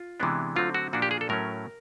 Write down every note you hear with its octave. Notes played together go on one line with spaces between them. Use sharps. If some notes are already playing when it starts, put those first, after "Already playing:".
Already playing: F4
C3 E3 G#3 B3 D4
D3 F#3 A3 C4 F4
F#4
A#2 F3 A#3 D4 F#4
G4
G#4
A4
A2 F#3 A3 C#4 A#4